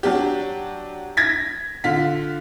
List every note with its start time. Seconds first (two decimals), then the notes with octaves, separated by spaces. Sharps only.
0.03 F#3 D4 G4
1.17 G#6 A#6 B6
1.84 D3 F4 B6